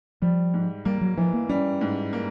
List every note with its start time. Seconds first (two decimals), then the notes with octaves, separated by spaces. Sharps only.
0.22 F3 G3
0.54 G#2
0.85 G3 A#3
1.01 F#3
1.17 E3 F3
1.34 A#3
1.49 G3 C#4
1.81 G#2
2.13 A#3